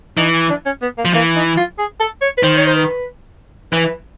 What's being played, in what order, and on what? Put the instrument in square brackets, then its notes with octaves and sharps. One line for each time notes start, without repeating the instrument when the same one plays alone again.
[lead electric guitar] E3 [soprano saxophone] D#4
[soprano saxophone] D4
C#4
B3
A#3
[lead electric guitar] F3
[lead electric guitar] E3 [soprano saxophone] A#3
[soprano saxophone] D#4
F4
G#4
A4
C#5
B4
[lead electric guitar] D#3 [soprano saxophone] C5
[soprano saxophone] C#5
C5
B4
[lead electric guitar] E3 [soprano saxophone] B4